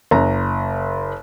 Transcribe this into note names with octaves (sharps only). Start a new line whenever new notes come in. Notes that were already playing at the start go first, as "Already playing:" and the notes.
F#1 A#5